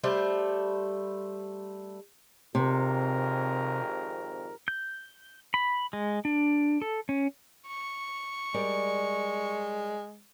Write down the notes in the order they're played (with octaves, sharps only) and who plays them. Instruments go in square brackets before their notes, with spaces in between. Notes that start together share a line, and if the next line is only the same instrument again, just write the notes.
[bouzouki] G3 A3 C5
[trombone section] G#1 F2 A#4 [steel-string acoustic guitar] C3
[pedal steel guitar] G6
B5
G#3
D4
A4
C#4
[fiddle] C#6
[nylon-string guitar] G3 A#4 D5 [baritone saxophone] G#3